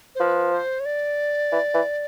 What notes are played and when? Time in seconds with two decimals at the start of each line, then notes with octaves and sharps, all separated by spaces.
0.15 C5
0.20 F3 B4
0.52 C5
0.80 C#5
0.86 D5
1.52 E3
1.74 E3